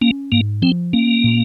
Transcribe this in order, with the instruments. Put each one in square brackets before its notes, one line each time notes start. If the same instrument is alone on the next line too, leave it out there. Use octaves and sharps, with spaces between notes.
[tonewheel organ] A#3 [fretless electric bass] C#4
[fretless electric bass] G#2 [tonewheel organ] A#3
[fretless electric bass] F3 [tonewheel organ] C4
[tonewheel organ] A#3 [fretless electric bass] C#4
[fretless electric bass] A#2